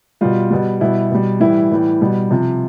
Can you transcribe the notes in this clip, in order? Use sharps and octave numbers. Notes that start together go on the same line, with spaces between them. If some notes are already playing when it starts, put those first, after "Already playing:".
B2 G3 F4
B2 G3
B2 G3 E4
B2 G3
A2 E3 G3 E4
A2 E3 G3
B2 G3
C3 F3